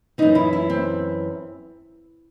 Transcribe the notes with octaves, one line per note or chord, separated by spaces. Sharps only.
F#2 E3 D#4
E4
E4
C4